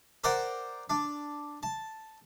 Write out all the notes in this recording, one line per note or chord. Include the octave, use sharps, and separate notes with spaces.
A#4 C5 D5 F#5 G5
D4
A5